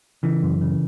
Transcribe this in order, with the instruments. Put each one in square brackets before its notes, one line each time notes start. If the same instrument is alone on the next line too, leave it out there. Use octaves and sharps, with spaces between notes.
[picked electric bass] C#3 E3
F#2
C#3